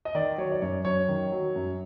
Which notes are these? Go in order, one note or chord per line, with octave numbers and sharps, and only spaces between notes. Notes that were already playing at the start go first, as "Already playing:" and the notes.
D#5
D#3 D5
F#3 C#5
D5
F#2 C#5
F#2 C#5
D#3
F#3
F#2